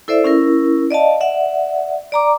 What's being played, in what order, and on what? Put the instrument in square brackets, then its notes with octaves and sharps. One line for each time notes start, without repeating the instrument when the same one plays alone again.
[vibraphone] E4 A4 C5 D5 E5
C#4 E4 A#4
D5 D#5 F5 A5
D5 E5 F#5
D5 A#5 D6